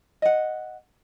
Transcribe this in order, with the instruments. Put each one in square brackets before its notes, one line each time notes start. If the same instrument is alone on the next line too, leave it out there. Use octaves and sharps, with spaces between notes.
[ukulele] D#5 F#5